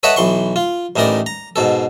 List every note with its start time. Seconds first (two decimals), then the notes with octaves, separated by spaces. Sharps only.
0.03 A4 B4 C#5 D#5 E5 F#5
0.16 B1 E3 C6 C#6
0.56 F4
0.96 A1 A2 E3 D#4 A#4 D5
1.26 A#5
1.56 G#2 B2 A4